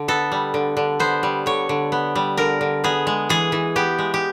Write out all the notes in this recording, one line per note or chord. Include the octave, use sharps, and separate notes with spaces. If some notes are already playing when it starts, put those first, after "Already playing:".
Already playing: D3
B3 A4
G3
D3
D3
B3 C5
G3
D3 C#5
D3
B3
G3
D3 A#4
D3
B3 G#4
G#3
E3 G#4
E3
B3 G4
G#3
G4